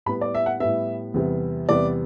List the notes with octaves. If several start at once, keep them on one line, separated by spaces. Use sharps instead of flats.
A2 G3 B3 B5
D5
E5
F#5
A2 G3 B3 E5
E2 C3 G3 B3
E2 C3 G3 B3 D5